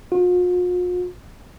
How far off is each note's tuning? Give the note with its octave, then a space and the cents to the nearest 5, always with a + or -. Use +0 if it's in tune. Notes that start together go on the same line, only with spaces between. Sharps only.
F4 +45